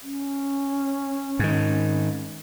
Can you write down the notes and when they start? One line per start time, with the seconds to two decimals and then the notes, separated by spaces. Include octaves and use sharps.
0.01 C#4
1.39 G#2 D#3